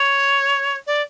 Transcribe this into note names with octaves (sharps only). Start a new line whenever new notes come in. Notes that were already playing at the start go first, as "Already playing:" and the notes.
Already playing: C#5
D5